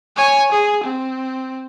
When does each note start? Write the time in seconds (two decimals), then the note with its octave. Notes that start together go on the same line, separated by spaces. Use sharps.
0.17 C#5 G#5
0.51 G#4
0.83 C4